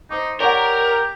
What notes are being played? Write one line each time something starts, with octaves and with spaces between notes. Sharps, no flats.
D#4 C5 D6
G4 A#4 C#5 D5 F#5